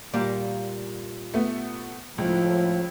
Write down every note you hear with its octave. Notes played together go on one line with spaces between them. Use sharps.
A#2 G3 A#3
A3 B3
C#2 A2 F3